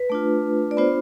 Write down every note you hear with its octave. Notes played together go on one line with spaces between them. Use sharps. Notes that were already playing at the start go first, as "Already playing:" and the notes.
Already playing: B4
A3 D4 F4
D5
B3 D4 F4 C5